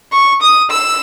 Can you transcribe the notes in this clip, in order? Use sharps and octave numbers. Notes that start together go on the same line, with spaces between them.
C#6
D#6
E6